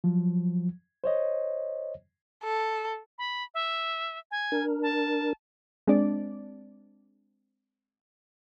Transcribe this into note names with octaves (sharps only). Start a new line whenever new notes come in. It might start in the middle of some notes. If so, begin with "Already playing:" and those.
F3 F#3
C5 C#5 D#5
A4
B5
E5
G#5
D4 A#4
A5
G#3 C4 D4 D5